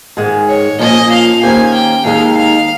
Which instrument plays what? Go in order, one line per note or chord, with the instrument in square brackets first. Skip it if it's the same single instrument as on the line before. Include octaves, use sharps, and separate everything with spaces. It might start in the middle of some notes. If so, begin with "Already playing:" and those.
[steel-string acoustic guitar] G#2 D#3 G#3
[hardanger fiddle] C#5
[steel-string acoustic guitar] A#2 F3 A#3 C#4 [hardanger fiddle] D#5
[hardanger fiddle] F5
[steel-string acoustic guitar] D#3 A#3 C#4 G4 C5 [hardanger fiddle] G#5
[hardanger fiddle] G5
[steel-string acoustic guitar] D#2 D#3 G#3 D#4 [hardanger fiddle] F5
[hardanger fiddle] F5